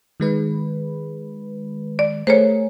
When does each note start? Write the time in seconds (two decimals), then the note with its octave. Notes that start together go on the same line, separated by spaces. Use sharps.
0.20 D#3 G#3 B4
1.99 D5
2.27 A3 G#4 A#4 C5 C#5